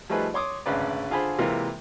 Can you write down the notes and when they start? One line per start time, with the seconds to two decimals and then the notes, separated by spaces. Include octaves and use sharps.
0.09 F3 G3 A3 D#4 G#4 B4
0.34 C#5 C6 D6 D#6
0.66 G#1 D2 C#3 B4 D5
1.10 D3 F4 G#4 C5 B5
1.39 C3 E3 G#3 A#3 F4 A#4